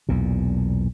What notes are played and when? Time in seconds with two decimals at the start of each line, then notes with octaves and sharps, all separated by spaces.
0.09 B1 E2 A#2